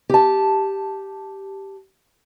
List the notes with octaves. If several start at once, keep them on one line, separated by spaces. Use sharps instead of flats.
G4 A5